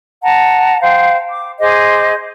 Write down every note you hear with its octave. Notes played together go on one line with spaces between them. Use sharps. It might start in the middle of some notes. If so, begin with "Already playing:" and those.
F#5 A5 A#5
C5 F5 G5
D6
G#4 C5 D#5 D6